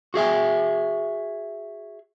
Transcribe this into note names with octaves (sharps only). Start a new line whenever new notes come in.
F#4 G#4 E5 G#5